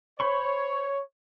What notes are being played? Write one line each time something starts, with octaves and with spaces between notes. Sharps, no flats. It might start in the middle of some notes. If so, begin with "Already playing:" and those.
C5 C#5 B5 C#6